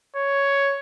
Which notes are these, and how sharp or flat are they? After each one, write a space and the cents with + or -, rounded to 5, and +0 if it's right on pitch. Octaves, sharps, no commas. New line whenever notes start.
C#5 +5